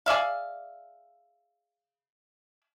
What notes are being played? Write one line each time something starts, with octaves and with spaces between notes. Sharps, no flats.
G#4 D5 E5 F5